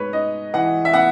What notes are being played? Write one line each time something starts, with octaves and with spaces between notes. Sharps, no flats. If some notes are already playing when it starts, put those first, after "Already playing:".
Already playing: G#2 B3 B4 C#5
D#4 D#5
E3 F#5
E5
B3 F#5